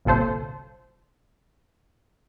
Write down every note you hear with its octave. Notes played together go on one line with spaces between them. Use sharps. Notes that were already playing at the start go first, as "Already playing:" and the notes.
G1 C2 A#2 A4 C5